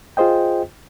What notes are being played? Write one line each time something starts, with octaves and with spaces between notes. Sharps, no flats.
F4 G#4 C5 D#5 G5